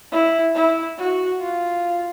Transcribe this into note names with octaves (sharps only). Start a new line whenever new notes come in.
E4
E4
F#4
F4